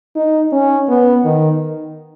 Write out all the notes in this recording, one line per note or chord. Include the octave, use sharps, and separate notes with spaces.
D#4
C#4
B3
D#3